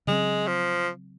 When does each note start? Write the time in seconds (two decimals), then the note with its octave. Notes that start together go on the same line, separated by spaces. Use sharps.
0.07 C#3 F#3 G#3 C4
0.47 F3